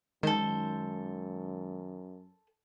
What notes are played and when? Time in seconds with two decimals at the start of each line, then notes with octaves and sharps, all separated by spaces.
0.23 F#2 D#3 G#3 A4 C5